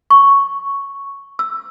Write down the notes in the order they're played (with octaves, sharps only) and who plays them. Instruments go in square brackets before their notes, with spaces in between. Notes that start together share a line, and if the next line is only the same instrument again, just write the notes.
[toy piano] C#6
E6